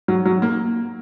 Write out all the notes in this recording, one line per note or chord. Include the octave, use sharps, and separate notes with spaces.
F#3
F#3
A#3